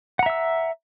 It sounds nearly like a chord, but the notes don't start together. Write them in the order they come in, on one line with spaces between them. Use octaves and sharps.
F#5 A#5 E5 E6